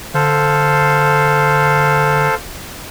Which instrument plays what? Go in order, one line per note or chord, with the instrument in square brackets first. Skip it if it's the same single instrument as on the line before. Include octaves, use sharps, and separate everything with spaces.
[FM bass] D3 [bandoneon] A4 C5 F5